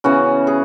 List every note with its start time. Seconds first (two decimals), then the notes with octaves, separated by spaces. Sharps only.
0.04 C#3 E3 B3 F#4
0.47 G#4